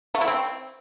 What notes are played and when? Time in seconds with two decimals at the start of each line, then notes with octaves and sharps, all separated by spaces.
0.15 A3
0.21 E4
0.28 C4